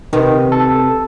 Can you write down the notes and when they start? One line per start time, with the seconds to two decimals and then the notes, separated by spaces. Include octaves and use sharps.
0.13 C3 D#3 B3
0.52 A4